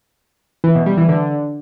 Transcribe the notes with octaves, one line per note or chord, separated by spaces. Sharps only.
E3
B2
G3
E3
D3